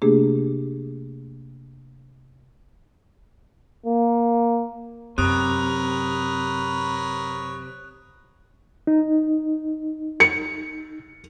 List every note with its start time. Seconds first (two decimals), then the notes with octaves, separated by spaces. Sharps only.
0.02 C3 A3 A#3 D4 G4 G#4
3.86 A#3
5.18 F#2 C3 A#4 B4 C#5 D#6 F#6
8.87 D#4
10.20 C#7